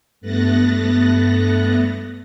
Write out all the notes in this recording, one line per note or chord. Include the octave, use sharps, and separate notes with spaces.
G2 A3 B3 F#6 A6 A#6